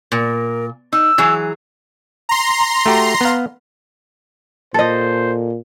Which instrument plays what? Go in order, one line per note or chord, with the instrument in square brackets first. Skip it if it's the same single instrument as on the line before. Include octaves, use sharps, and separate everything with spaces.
[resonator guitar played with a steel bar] A#2 [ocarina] A#4
[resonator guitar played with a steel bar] D#4 [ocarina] E6
[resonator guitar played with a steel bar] E3 F#3 G#4
[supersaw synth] A#5 C6
[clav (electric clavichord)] A3 F#4 G4
B3 F5
[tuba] A#2 [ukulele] A4 D#5 [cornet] C5